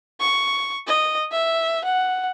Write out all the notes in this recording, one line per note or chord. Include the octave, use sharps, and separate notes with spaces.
C#6
D#5
E5
F#5